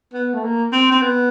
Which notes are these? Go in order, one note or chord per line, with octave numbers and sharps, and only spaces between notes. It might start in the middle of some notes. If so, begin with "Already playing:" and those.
B3
A3
A#3
C4
C4
B3